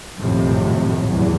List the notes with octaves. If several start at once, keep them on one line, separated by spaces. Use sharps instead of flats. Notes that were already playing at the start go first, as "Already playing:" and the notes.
A#1 F#2 A2 C3 D#3 F3
E2 F#3